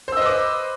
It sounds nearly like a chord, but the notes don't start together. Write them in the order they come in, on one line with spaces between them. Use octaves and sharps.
C5 E6 D#5 B4 D6